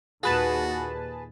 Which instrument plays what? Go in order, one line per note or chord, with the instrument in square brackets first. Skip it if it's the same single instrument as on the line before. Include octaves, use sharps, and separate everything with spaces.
[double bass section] D#2 A#2 [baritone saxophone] F#4 [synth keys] G#4 B4 A5